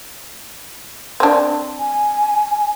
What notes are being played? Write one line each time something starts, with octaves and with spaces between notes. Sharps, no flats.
C4 D4
G#5